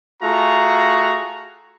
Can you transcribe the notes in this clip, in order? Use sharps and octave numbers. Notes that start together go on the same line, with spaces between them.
A3 F4 F#4 G#4 A#5